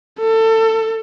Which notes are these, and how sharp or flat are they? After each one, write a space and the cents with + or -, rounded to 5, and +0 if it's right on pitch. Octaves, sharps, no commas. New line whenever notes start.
A4 +25